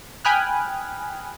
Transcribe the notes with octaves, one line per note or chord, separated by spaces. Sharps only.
G5 G#5 B5 D#6 F6 F#6